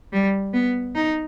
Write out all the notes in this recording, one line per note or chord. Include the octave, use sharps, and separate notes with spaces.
G3
B3
D#4